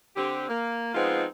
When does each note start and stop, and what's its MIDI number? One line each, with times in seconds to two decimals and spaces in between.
0.16 0.44 50
0.16 0.44 60
0.16 0.44 67
0.48 0.94 58
0.95 1.25 53
0.95 1.25 56
0.95 1.25 59
0.95 1.25 60
0.95 1.25 63
0.95 1.25 65